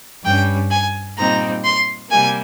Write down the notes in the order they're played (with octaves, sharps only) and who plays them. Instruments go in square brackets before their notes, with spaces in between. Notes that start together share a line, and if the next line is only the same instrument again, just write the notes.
[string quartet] G2 G3 C#4 G5
G#5
A#2 G3 C4 D#4 A#5
C6
C3 G3 A#3 G#5